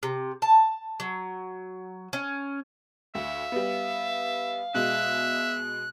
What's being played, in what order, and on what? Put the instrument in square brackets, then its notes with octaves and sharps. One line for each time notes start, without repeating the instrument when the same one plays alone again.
[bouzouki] C3
A5
F#3
C#4
[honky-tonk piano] D2 [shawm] E5 [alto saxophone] F5
[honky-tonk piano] G3 B3
[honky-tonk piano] B2 G#3 [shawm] E5 [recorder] F#6